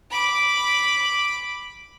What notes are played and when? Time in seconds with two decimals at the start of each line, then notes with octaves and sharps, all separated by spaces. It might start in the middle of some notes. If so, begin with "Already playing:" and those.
0.10 B5 D6